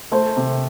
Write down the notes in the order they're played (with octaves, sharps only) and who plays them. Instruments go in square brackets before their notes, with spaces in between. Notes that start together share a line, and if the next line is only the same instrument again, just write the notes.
[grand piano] A3 [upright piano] C5
[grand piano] C3